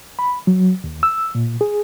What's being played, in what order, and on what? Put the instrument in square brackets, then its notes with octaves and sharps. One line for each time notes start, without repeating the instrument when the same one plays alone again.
[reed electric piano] B5
F#3
D#2
E6
A#2
G#4